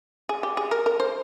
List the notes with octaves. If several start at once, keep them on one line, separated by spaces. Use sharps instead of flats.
G#4
G4
G#4
A#4
A#4
C5